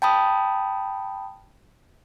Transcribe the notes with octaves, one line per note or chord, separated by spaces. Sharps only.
G5 A5 B5 D#6